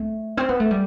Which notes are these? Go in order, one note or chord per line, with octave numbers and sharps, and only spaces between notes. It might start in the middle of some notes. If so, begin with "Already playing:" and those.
Already playing: A3
C4
B3
A3
G3